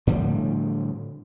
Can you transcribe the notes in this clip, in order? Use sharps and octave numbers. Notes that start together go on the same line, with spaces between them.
A2 D3 F3 G3